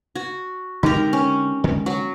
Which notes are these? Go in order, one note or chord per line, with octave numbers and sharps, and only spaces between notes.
F#4
D3 G#3 C4 D#4 G4 A#4
C#4
D3 G#3 A#3
F#3